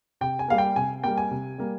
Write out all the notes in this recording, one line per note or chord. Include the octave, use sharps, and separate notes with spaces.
C3 G5
G#5
G3 A#3 F5
G5
C3 G#5
G3 A#3 G5
G#5
C3
G3 A#3